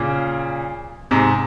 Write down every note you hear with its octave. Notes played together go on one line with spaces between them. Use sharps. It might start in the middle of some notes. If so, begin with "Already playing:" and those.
Already playing: A#2 C#3
G#2 C3